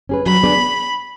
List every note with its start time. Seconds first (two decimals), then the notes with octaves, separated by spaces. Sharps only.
0.09 C#4 G#4 B4
0.26 F#3 B5
0.43 B3 D4 G#4 D5